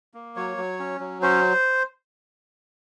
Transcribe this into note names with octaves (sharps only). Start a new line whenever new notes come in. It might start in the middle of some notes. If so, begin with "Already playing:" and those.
A#3
F#3 C#5
F#3
C#4
F#3
C#4 C5